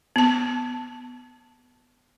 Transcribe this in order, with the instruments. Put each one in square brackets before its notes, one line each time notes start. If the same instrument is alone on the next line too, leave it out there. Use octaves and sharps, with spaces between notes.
[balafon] B3 A5